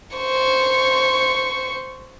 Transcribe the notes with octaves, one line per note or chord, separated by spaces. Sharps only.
C5 C#6